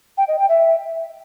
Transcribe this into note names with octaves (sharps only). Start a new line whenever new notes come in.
G5
D#5
G5
E5